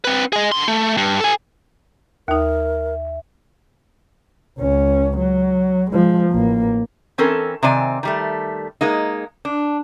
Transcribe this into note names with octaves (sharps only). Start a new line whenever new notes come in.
C4 B4
G#4 D#5
D3 C6
A3
G2
A4 G#5
D#2 D#4 A#4 E5
C#2 C#4
F#3
F3 G#3
A1 A#3
E3 C4 C#4 A4 A#4
C3 D#3 C4 D5 G#5
D#3 G3 A3
G#3 A#3 D#4
D4